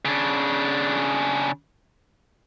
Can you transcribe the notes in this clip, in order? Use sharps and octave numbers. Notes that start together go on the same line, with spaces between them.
C#3 D4